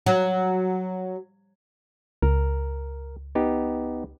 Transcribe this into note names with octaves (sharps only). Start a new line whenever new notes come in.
F#3
C#2 A#4
B3 D#4 G4